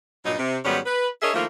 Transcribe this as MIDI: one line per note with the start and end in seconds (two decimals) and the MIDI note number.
0.25 0.35 43
0.25 0.35 46
0.25 0.35 54
0.25 0.35 63
0.38 0.57 48
0.64 0.79 44
0.64 0.79 51
0.64 0.79 54
0.64 0.79 55
0.64 0.79 59
0.64 0.79 61
0.86 1.08 71
1.22 1.32 62
1.22 1.32 68
1.22 1.32 70
1.22 1.32 73
1.22 1.32 75
1.22 1.32 76
1.34 1.46 51
1.34 1.46 53
1.34 1.46 57
1.34 1.46 58
1.34 1.46 64
1.34 1.46 65